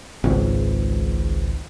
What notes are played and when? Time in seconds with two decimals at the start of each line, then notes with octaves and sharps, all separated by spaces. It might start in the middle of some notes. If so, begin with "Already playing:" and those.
0.24 G#1 C#2 G#2